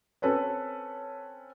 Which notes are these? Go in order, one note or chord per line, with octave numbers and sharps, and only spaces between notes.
C4 C#4 A4 B4 C#5